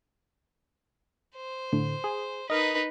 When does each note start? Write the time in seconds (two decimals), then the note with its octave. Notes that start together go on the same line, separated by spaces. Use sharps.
1.36 C5
1.73 A2 D3
2.04 G#4
2.50 D#4 A#4 B4 D#5